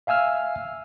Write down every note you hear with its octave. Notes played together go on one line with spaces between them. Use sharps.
E5 F5 G#5 E6 F6